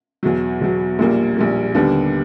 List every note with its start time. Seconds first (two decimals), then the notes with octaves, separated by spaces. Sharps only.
0.23 E2 B2 F#3
0.61 E2 B2 F#3
0.99 A#1 A#2 G3 A#3
1.37 A#1 A#2 G3 A#3
1.75 D#2 D3 G3 B3 D4